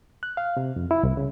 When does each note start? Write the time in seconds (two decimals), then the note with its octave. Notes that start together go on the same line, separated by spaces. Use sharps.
0.23 F#6
0.37 F5
0.57 C3
0.76 F2
0.91 E4
1.03 C2
1.17 C#3